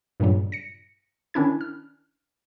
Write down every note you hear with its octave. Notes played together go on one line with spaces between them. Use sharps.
G2 A#2 C#3 F#3 G3
A#6 C#7
D#3 C#4 D4 E4 G#6
F6